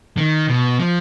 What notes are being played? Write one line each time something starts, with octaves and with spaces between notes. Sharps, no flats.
D#3
B2
F3